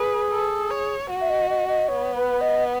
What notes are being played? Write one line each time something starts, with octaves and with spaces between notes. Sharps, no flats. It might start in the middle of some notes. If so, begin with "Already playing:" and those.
Already playing: G#4 B4
A4
C#5
F#4
E5
D#5
D#5
D#5
B3 C#5
B4
D#5